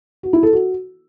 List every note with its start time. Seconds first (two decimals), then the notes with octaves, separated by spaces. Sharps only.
0.23 F#4
0.33 E4
0.43 A4
0.53 F#4